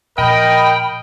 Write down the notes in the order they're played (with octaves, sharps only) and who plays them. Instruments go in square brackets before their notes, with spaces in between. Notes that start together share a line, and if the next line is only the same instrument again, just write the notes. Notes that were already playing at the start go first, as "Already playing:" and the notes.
[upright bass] A#2 F3 [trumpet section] A#4 D#5 [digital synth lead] G5 [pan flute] B5